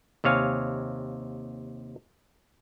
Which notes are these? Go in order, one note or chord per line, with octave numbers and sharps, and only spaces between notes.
D#2 C3 C#5 F5 G#5